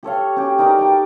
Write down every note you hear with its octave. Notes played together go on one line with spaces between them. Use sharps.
G4 A4 C#5 F5
C#4 G4
D#4 A#4 D5 D6
G5 A5